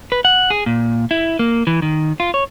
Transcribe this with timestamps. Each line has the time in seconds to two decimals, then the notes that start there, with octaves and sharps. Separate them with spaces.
0.12 B4
0.25 F#5
0.50 G#4
0.66 A#2
1.11 E4
1.39 A#3
1.67 E3
1.82 D#3
2.20 F4
2.34 C#5